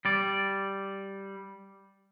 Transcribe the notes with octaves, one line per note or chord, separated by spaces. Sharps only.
G3 D5